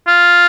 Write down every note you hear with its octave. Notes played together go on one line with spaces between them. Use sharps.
F4